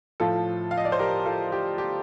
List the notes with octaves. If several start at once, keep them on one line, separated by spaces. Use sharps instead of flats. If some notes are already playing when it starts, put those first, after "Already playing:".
A2 F3 F4 A4
F5
D#5
D5
C5
G4 A#4
F4 A4
G4
G4